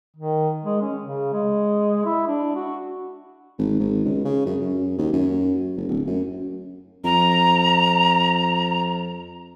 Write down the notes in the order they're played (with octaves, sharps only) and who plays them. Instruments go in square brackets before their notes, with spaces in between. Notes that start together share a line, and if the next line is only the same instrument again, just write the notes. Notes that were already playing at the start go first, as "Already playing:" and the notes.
[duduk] D#3
G#3
C#4
C#3
G#3
E4
D4
F#4
[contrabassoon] G#1
G#1
C#2
C#3
F#2
F#2
D#2
F#2
F#1
D1
F#2
[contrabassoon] F2 [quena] A#5